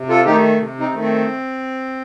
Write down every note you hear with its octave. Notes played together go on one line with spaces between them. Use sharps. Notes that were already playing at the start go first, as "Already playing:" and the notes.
Already playing: C3
F4 A4
D#3 A3 D#4 G4
C3
C4 D#4
D#3 A3
C4